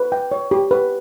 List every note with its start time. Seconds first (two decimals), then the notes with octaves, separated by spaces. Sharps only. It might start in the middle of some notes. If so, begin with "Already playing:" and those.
Already playing: B4
0.12 G5
0.32 C#5
0.51 G4
0.71 B4